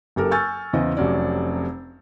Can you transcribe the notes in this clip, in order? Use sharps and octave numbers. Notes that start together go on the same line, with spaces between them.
F#1 F#2 G4 A4 A#4
G#5 C#6 E6 F6 G6 A6
E2 C#3 E3 C5 D#5
F1 C3 F#3 C#4 D5